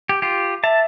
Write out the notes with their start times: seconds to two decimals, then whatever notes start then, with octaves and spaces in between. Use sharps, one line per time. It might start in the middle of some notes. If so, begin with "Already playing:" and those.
0.09 G4
0.22 F4 G4
0.64 E5 A5